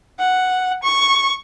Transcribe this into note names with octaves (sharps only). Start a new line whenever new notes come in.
F#5
C#6